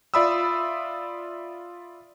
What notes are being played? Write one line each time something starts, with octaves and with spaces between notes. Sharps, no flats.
F4 D5 E5 B5 D#6 E6